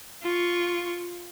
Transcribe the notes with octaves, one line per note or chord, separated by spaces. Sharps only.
F4 C#6